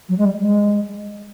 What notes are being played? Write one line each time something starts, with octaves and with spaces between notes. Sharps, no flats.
F#3
G#3
G3
G#3